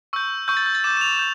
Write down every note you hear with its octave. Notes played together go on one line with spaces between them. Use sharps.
C#6 E6 G6
C#6 E6 G6
A6
G6
A6
D6 G6 E7
E7
F7
G6